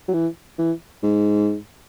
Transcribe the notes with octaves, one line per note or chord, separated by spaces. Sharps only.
F#3
E3
E3
G#2